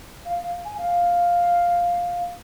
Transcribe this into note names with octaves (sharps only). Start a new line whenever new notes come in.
F5
F5
G#5
F5